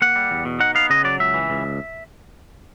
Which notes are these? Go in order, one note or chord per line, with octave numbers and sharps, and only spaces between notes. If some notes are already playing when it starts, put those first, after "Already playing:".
A#3 F#5
G3
E2
B2
D#4 F#5
B3 F5
C#3 D#5
F#3 D5
C#2 E5
E3
C#2